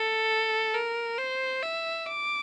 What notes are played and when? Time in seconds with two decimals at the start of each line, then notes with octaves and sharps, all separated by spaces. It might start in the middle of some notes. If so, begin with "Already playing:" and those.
Already playing: A4
0.75 A#4
1.19 C5
1.63 E5
2.07 D6